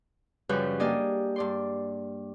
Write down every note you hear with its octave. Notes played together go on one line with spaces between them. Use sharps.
F#2 C#3 F3 G3 B4 G6
A#3 D4 G4 D5 D#5 G#5
G2 D5 C6